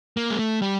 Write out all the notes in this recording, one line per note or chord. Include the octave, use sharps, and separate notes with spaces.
A#3
G#3
A3
G3